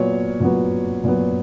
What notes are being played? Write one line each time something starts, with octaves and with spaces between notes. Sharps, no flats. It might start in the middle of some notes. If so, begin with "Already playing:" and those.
Already playing: A#2 F#3 B3 C#5
A#2 F#3 B3
A#2 F#3 B3